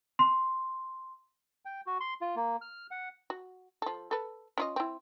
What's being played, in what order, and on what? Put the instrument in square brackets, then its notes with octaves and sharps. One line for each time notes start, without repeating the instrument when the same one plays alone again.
[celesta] C6
[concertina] G5
F#4
C6
F4
A#3
F6
F#5
[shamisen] F#4
F3 A4
A4 B4
C#4 F4 D#5
C4 E4